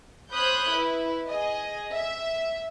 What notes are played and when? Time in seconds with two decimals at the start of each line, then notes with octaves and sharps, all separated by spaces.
0.33 C5 C#5 B5 D#6 F#6 G6
0.72 E4 B4
1.28 G#4 D#5
1.94 E5